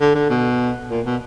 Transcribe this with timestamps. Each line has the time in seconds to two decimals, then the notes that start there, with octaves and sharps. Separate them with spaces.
0.01 D3
0.15 D3
0.30 B2
0.91 A#2
1.06 B2